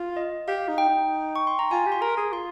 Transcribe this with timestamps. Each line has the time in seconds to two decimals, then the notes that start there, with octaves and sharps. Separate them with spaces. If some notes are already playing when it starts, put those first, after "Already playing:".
Already playing: F4
0.17 D#5
0.48 G4 F5
0.68 D#4
0.78 G5
0.89 D#4
1.36 C#6
1.47 C6
1.59 A#5
1.71 F4 G#5
1.86 G4
1.92 C6
2.01 A#4 A#5
2.17 G#4
2.33 F4 C6